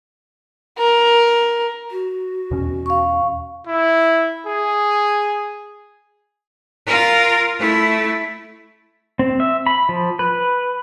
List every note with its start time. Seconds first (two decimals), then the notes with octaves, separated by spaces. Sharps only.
0.78 A#4
1.91 F#4
2.51 E2 B2 C#4
2.86 F5 C#6
3.67 E4
4.47 G#4
6.87 F4 A#4
7.59 A3 E4
9.19 C4
9.40 E5
9.67 B5
9.89 F3
10.19 B4